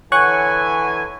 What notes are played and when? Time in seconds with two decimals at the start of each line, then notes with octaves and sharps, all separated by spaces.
0.12 D3 E3 C#5 F#5 G#5 C#6